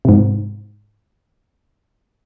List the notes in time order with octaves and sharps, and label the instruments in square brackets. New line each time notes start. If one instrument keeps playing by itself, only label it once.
[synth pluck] G#2 C3